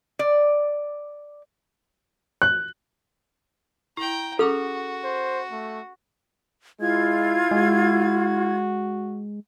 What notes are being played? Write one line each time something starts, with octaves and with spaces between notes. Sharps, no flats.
D5
F#6
E4 G5 A#5
C#4 F#4 G#4 A4 D6
C5
A3
G#3 E4 F4 G#6
G#3 F#4